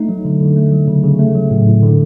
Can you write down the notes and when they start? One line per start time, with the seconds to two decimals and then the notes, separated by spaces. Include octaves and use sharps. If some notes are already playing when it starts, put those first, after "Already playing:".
Already playing: A3 D#4
0.09 F#3
0.25 D3
0.40 D3
0.56 A3
0.72 F#3
0.88 C#3
1.04 C#3
1.19 A3
1.35 F#3
1.51 A2
1.67 A2
1.83 D3